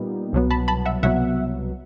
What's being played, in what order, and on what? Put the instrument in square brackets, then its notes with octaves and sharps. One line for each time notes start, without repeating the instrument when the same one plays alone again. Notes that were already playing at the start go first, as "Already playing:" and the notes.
Already playing: [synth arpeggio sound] A#2 G3 B3 D#4
C2 B2 F#3 B3
A5 B5
A5 B5
E5 F#5
C2 B2 F#3 B3 E5 F#5